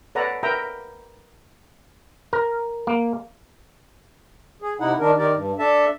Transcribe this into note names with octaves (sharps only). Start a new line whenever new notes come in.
A4 B4 C#5 D5 F#5 A#5
A#4 B4 E5 G5 A#5
A#4
A#3
G#4
C3 D#4 E4 F#5
D#3 D4 A#4
D#3 G4 A#4 D5
G2
D4 A4 E5 A5